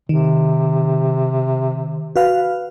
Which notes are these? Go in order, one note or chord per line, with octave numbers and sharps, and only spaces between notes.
C3 D#3
F#4 B4 F5